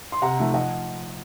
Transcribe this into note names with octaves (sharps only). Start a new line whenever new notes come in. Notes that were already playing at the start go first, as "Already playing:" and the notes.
C6
C3 F#5 A#5
F3 A3 D#4
F3 D#5 F#5